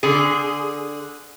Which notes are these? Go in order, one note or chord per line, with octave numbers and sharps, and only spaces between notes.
D3 G#4